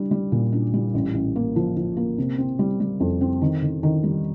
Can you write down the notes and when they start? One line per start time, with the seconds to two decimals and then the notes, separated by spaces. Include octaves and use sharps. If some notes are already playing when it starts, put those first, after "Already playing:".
Already playing: G3 D4
0.11 G3
0.32 A#2
0.53 D4
0.74 G3
0.94 A1
1.14 A1
1.36 A#3
1.56 F3
1.77 F3
1.97 A#3
2.18 C3
2.38 C4
2.59 G3
2.80 G3
3.00 F2
3.21 C4
3.42 D#3
3.62 D#3
3.83 D#3
4.03 G3